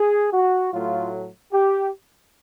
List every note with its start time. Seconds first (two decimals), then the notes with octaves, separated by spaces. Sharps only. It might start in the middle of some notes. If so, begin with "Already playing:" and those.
Already playing: G#4
0.33 F#4
0.73 A2 F#3 A3 F4
1.52 G4